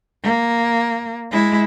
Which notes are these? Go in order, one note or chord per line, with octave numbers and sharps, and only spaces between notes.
A#3
G#3 E4